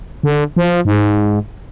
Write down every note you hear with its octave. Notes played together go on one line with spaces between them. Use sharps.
D3
F3
G#2